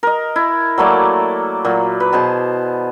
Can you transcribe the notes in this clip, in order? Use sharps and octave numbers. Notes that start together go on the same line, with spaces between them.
A#4 D#5
E4
F#3 A3 A#3 D5
A#2 F#3
B4
B2 G#4 C5 A5